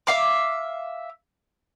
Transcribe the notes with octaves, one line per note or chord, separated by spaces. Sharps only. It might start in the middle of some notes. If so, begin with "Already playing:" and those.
E5 F5 D6